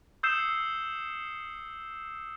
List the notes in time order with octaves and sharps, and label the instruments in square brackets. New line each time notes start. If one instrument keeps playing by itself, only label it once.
[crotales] D#6 E6 G6 C7 C#7 E7